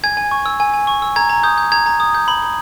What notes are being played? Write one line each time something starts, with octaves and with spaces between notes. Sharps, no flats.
G#5 G#6
G#5
C#6
E6
G#5
G#5
C#6
E6
A#5 G#6
A#5
D#6 G6
G6
A#5 G#6
A#5
D#6
G6
B5
B5